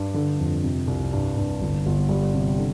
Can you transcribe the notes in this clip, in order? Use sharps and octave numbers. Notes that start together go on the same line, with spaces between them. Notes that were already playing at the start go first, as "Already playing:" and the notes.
Already playing: G2
D3
F2
C3
C2
G2
G2
G1
G1
G3
C3
D3